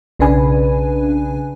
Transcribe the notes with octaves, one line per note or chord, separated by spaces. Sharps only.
B1 C#3 D4 B4 G#5